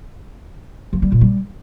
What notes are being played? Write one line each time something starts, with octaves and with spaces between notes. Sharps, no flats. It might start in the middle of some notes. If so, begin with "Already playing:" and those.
F3
G3
A#2
G3